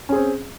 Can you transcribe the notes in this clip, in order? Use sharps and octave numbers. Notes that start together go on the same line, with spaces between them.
C4 C#4 G#4